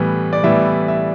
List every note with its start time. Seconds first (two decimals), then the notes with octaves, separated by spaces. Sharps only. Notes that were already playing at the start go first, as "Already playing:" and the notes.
Already playing: A2 E3 G3 B3
0.33 D5
0.44 A2 E3 G3 B3 E5
0.88 E5